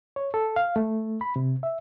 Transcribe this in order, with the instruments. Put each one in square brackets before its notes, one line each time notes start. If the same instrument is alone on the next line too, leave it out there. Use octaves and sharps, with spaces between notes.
[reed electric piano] C#5
A4
F5
A3
B5
C3
E5